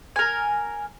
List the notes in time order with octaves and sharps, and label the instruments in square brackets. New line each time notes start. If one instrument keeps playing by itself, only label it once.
[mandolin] A#4 G#5